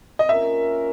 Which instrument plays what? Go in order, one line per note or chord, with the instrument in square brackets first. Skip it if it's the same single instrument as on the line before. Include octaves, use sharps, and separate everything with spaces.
[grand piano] D#5
[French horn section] A#3 C#4 F4 A#4 [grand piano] E5